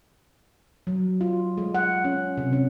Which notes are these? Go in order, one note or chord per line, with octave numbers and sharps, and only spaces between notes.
F#3
F4
G#3
F#5
C#4
C3
C#4